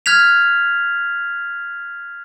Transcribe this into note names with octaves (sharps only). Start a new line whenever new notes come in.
F6 F#6 G#6 B6 F7